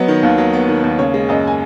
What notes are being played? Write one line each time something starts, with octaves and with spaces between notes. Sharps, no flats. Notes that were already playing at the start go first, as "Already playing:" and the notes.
Already playing: F#3 B3 D#5
D#3
D#2
F#3
B3
D#3
D#2
C#3 C#5
G#3
F#2 D#5
G#5